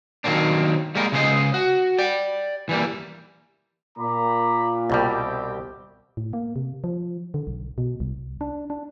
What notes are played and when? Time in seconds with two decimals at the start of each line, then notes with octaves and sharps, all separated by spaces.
0.24 D#3 F#3 A#3 C4 D4
0.95 G3 G#3 A#3 A#4
1.12 C#2 C#3 G#3 F4 C5 D#5
1.54 F#4
1.98 D5 G5
2.69 E3 G3 A#3
3.99 A#2 A#5 B5 D6
4.90 C2 B2 G3 C4 G4
6.17 A2
6.33 A#3
6.56 C3
6.84 F3
7.34 D3
7.47 B1
7.78 B2
8.00 C2
8.41 D4
8.70 D4